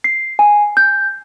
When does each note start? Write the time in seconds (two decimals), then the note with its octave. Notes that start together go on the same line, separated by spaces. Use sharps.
0.04 C7
0.39 G#5
0.77 G6